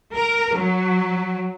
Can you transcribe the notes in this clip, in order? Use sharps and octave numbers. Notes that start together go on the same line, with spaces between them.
A#4
F#3